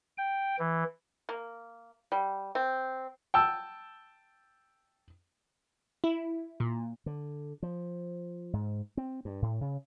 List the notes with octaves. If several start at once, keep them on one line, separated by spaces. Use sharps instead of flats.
G5
E3
A#3
G3
C4
G5 A5 E6
E4
A#2
D3
F3
G#2
C4
G2
A2
C#3